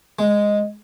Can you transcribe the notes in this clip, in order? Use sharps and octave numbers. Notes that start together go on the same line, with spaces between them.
G#3 D#5